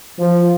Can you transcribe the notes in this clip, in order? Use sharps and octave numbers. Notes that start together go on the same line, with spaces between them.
F3